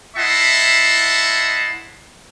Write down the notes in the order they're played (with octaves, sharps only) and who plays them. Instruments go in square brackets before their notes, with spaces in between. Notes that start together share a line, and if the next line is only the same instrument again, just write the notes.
[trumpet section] E4 D#5 E5 F#5 A5 C6